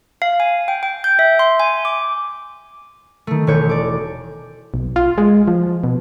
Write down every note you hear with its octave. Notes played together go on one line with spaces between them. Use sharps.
F5
G#5
G5
G5
G6
E5
C6
G#5
D6
D#3 A3
E1 A3 C#5 G6
D5 D6
B1
F4
G#3
F3
B2